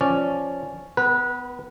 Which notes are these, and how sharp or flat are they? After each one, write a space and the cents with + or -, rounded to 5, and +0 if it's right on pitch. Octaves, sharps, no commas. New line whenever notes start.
F3 +0 C#4 +0 D5 -5
B3 +20 B4 -25